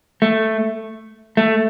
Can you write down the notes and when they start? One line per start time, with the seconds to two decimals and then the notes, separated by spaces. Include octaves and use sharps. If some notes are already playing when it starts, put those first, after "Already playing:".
0.22 A3
1.37 A3